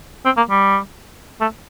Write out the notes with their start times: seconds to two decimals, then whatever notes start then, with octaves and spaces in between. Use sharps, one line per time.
0.25 C4
0.37 A#3
0.50 G3
1.41 A3